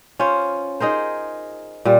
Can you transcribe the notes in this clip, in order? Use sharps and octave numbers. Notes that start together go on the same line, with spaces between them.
C#4 F4 C5 C#5
D#4 G#4 A#4 C5
A#2 G3